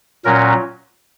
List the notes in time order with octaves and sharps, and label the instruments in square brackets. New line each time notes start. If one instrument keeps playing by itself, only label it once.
[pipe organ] A#2 F#3 C#4 A#4